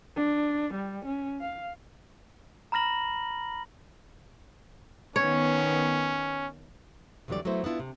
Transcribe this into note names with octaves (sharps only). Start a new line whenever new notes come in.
D4
G3
C#4
F5
A#5 B5 F6 A#6 F#7
D#3 B3 C#4 C#5
E2 D3 E3 F#3 G3 D5
F#3 A3 B3 E4 C5
B3 D4 E4 F4
C3